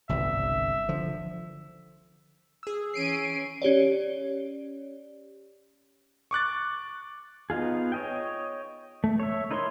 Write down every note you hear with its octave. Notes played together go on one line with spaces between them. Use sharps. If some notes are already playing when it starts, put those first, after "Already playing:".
G1 C2 E5
D3 F3
G#4 E6
E3 C#4 C7 D7 D#7
C#4 G4 C#5 D5
C#6 D6 F#6 A6
B3 D#4 F4 G#4
C#5 D#5 G5
A3
C#5 E5
D#4 E4 A#4 C#5 C6